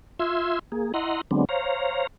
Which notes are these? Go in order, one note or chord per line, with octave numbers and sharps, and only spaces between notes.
F4 E5 C6 E6 G#6
A#3 G#4
E4 D#5 F#5 A#5 C6
D3 F#3 G#3 B3 C4 D4
C5 C#5 F5 A#5